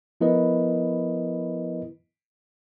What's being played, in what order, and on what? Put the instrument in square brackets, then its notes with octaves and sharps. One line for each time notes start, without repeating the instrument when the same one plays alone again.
[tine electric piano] F3 B3 E4 A#4 B4 D#5